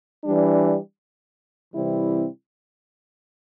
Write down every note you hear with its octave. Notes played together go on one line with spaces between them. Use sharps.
E3 G3 D4
C3 E3 G3 C4 E4